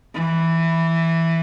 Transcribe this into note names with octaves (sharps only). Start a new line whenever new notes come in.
E3